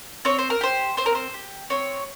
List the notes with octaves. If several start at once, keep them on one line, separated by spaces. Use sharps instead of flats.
C4 C#5
C5
A#4
G4 C5
C4 C5
A#4
C5
G4
C4 C#5